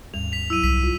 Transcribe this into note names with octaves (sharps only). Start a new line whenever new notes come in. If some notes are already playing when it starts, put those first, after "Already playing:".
D#2 G#2 G3 F7
B6 F7
F#3 E4 E6 D#7
C2 B6
F4